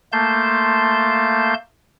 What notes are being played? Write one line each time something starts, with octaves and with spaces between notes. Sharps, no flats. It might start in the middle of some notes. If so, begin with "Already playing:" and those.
A3 A#3 A5 C6 G6